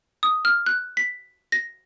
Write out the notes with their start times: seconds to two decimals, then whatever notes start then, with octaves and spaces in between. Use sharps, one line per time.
0.23 D#6
0.45 F6
0.66 F#6
0.97 B6
1.52 A#6